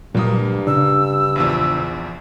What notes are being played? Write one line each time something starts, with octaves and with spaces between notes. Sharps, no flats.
D2 G2 A#2 F#3 G3 A#3 D#6
C#3 D4 E6
A#1 E2 F3